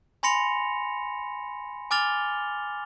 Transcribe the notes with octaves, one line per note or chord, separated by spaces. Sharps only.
G#5 B5 C6 A#6 C#7 F7
G#5 D6 F6 A6 F7 G7